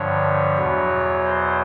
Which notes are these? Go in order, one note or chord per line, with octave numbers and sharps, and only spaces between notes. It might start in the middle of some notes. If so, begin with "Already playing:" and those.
Already playing: G2 D3 F3 C#5
E2 B2 F#3
C5